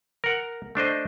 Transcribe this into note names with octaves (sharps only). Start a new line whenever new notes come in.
A#4 F#5
A3 D4 C5 D#5